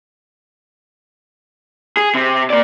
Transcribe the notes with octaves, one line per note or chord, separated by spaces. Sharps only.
G#4
C3
A#3 D5